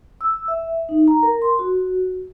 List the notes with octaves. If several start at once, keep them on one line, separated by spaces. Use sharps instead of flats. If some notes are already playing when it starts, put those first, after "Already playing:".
E6
E5
D#4
A#5
A#4
C6
F#4